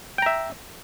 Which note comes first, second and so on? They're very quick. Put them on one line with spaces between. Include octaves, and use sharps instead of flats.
G5 A#5 E5